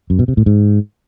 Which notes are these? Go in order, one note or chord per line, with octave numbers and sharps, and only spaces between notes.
F#2
B2
C3
A2
G#2